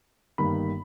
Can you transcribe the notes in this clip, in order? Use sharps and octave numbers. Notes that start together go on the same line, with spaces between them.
G1 G2 D#3 A#3 B5